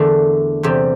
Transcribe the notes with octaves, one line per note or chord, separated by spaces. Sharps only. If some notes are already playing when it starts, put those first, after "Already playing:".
Already playing: E2 D3 A3 A#3
E2 C3 G3